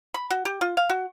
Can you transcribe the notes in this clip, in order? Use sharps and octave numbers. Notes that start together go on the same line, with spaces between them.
B5
F#4
G4
F4
F5
F#4